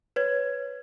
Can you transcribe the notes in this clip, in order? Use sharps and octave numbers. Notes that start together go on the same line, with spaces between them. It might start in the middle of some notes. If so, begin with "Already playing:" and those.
B4 C#5 G#6